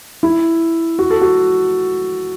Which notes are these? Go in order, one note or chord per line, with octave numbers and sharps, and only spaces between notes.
E4
F#4
A4
F#4